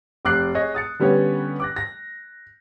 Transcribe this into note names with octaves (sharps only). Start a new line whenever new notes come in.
F1 D6 F#6 C7
G#4 C#5 D#5
D#6 A6 C#7
D3 G3 B3 C#4 C#5
D6 F#6 A#6
A#6